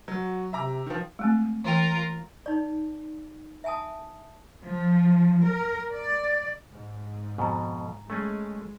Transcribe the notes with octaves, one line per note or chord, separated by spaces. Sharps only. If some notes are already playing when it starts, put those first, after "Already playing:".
F#3 F#4
C3 E5 A#5 D6
D#3 F3
G#3 A3 C4
E3 F4 A#4 G5
D#4 D5
E5 F#5 G#5 A5 D#6
F3
A#4
D5
G#2
F2 B2 G#5 A#5
G#3 A3 C#4 G#4